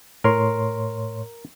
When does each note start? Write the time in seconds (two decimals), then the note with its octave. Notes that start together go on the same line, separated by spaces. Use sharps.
0.24 A2 A#4 C#5 C6